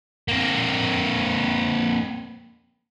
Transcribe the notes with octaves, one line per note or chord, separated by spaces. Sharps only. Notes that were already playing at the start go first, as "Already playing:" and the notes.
A#3 C4